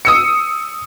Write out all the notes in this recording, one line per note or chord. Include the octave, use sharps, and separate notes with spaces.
D#6 E6 C#7